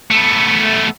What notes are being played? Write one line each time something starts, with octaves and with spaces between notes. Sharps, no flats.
A3 B3